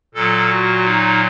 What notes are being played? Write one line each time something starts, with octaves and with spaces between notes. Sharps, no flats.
A#2 F#3 A4
F#4
D#4